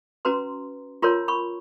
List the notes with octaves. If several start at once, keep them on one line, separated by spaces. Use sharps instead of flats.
C#4 F#4 B4 A#5 C6
F4 A#4 C#5 A#5 C6
B5 C#6